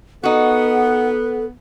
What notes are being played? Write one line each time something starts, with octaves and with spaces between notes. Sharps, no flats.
B3 D#4 F#4 A4 F#5